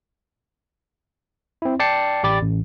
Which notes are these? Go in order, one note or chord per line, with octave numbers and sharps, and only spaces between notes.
C4 E4
D5 G5 A5 C7 C#7
A1 G4 D5 B5 D6 A6
A1